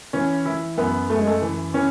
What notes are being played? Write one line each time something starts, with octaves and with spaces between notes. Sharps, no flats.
E3 C#4
E3 E4
F#2 B3
F#2 A3
G#3
A3
E3
E3 C#4